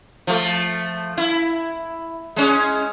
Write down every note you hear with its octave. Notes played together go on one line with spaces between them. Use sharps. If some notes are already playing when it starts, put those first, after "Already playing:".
F3 A3
E4
G#3 C#4